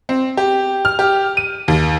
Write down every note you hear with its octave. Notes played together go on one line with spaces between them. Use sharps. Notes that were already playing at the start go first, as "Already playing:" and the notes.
C4
G4
F6
G4
D#7
D#2